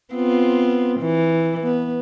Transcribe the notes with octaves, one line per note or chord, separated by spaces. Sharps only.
B3 C4 F4
E3
B3